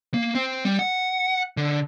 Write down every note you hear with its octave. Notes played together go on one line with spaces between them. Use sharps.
A#3
C4
G3
F#5
D3